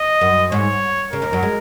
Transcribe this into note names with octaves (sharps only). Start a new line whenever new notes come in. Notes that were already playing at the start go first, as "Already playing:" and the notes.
Already playing: D#5
F#2
G#2 C#5
C#3 A#4
D#2 D#3
F#2 F#3
G#3